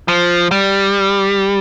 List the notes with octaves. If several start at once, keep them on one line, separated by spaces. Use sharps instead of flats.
F3
G3